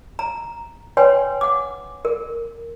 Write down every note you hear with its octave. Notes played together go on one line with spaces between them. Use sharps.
A#5
B4 C#5 G5 G#5 C6
F#5 D6
A#4